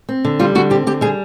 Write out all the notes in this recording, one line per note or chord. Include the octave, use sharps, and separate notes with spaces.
C4
D3
G3 F4
D3 F#4
C4 G4
D3 G4
G3 G#4